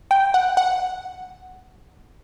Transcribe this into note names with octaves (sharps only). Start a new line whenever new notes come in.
G5
F#5
F#5